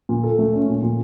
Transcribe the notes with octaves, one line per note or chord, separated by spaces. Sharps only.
A#2
A4
A3
C#4
A#2
A#2